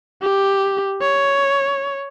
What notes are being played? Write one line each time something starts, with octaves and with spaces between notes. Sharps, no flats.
G4
C#5